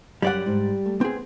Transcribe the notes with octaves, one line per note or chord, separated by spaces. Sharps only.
F#2 G3 D5 F#5
G#2
A3
B3 C4 G#4